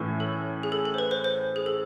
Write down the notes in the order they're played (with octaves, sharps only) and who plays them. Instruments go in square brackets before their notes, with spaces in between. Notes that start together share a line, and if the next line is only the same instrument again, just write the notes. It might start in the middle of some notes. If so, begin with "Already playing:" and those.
Already playing: [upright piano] A2 E3 A3 C#4
[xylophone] A4
G#4
A4
A4
C5
B4
C5
C5
G#4
A4